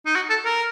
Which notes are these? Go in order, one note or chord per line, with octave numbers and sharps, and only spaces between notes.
D#4
F#4
A4
A#4